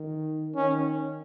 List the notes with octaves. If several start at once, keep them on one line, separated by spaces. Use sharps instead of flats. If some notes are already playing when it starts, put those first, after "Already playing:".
Already playing: D#3
D#3 C#4